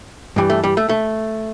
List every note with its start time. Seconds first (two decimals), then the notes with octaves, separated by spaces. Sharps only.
0.36 G2 E3 G3
0.50 A3
0.64 G3
0.77 A3
0.89 A3